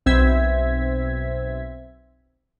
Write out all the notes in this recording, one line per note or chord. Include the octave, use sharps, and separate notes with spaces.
B1 C4 E5 G#6 B6